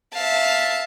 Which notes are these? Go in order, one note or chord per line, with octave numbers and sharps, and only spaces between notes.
E5 F5 A5